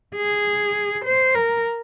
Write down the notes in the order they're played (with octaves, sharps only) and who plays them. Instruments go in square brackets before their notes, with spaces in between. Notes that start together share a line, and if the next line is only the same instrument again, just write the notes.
[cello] G#4
C5
A#4